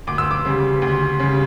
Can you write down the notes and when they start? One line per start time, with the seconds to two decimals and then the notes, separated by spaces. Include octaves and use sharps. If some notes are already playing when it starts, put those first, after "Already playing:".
0.07 D2 D6
0.18 E6
0.31 D6
0.45 C#3 G3
0.82 D2
1.19 C#3 G3